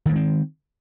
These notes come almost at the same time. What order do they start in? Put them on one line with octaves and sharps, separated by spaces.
D#3 A#3 G#3 C4